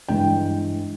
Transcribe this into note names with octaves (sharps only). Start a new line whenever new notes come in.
G2 E3 G#3 G5